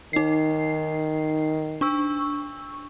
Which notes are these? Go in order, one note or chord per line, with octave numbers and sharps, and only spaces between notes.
D#3 D#4 C7
D4 C#6 E6